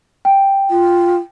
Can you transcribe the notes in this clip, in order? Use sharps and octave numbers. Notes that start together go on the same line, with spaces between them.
G5
F4